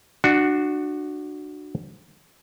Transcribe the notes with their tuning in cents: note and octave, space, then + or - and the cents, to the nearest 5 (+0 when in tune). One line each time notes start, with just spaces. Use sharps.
D4 +25 F#4 +0